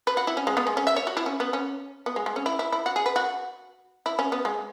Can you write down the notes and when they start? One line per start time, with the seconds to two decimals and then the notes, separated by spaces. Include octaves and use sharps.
0.07 B4
0.17 F#4
0.27 E4
0.37 C#4
0.47 G#3
0.57 B3
0.67 G#3
0.77 C#4
0.87 E5
0.96 C#5
1.07 F#4
1.17 E4
1.26 C#4
1.40 B3
1.53 C#4
2.06 B3
2.16 G#3
2.26 G#3
2.36 C#4
2.46 E4
2.59 E4
2.72 E4
2.86 F#4
2.96 G#4
3.06 B4
3.16 F#4
4.06 E4
4.19 C#4
4.32 B3
4.45 G#3